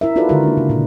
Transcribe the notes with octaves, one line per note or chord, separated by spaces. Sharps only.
E4 A#4 E5
D#4 F4 F#4 A4 B4 D5
D3 D#3 G#3 E4 F#4 A#4
A#3 D4
C#3
A#2 D4